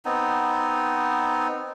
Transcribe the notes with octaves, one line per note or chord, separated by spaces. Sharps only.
B3 C4 D#4